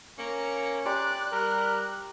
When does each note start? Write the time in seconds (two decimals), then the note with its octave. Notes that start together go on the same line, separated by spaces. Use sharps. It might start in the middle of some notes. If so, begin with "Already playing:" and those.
0.18 A#3 C#4 A#5 C#7
0.86 G4 D5 A#5 C6 F#6
1.32 G3 A#4